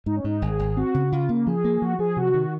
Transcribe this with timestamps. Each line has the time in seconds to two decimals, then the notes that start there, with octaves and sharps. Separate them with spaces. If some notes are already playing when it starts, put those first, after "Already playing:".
0.06 G#2 D#4
0.16 C#4
0.24 G#2 D#4
0.42 G#1 G#4
0.59 G#1
0.77 C4 F#4
0.94 C#3
1.12 C#3 F4
1.29 C#3 A#3
1.47 F3 G#4
1.64 A#3
1.81 F3 F#4
1.99 F3 G#4
2.17 C3 F#4
2.34 D#3